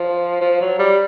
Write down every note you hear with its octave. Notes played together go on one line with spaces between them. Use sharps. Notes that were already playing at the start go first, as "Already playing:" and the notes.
Already playing: F3
F3
F#3
G3